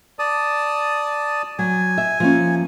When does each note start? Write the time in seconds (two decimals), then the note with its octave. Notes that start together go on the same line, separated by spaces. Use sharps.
0.19 D5 A5 D#6
1.59 F#3 G#5
1.98 E5
2.20 F3 A#3 C#4